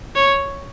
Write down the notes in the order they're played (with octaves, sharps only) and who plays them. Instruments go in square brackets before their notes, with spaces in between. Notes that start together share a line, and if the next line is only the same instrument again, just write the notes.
[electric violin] C#5